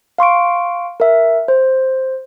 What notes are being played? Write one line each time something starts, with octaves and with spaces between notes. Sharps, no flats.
F5 C6 C#6 D7
A#4 E5
C5